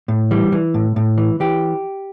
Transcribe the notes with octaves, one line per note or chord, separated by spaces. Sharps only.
A2
E3 G3
E3
A2
A2
E3
E3 G4